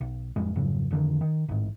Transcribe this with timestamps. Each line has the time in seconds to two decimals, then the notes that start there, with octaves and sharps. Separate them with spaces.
0.01 B1
0.36 A1 F2 G3 G#3
0.56 F2 G#2 C#3 F#3
0.91 F2 D3 D#3
1.21 D#3
1.49 A1 G#2